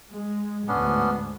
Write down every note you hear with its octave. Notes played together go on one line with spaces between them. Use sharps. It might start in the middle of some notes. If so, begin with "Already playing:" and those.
G#3
D2 G#2 B3 C#4 D4